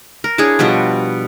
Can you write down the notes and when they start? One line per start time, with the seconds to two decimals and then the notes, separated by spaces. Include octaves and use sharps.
0.24 A#4
0.38 D4 E4 G#4 C#5
0.59 B2 F3 G3 F#4